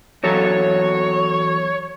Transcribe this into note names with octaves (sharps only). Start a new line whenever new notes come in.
E2 F#3 A4 C#5